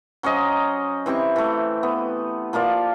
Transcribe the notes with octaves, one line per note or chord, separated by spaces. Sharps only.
F#3 C#4 C5 D#5
E3 C4 G4 C#6
E3 A3
B3
F3 A#3 F4 D5